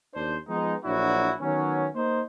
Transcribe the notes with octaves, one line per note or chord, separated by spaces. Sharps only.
D#2 D4 C5
F3 G#3 B3 D#4
A#1 F#3 D4 E4 F#4
D#3 F#3 B3 C#4
A#3 D#4 C5